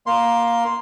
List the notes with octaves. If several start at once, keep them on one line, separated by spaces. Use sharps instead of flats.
A#3 C6